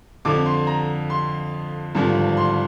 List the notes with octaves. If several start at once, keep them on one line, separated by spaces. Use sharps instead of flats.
F2 D3 F3 D6
C6
A#5
C6
G#1 G2 D3 F3
C6